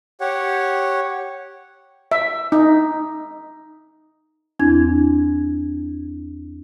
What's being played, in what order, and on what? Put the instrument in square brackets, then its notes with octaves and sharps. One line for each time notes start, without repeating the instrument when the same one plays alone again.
[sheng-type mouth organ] G4 C#5 F#5
[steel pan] E5
D#4
[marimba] E2 C4 D4 E4 G#6